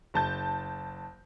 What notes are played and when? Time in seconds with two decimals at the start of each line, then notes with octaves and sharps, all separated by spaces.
0.14 F#1 A5 G6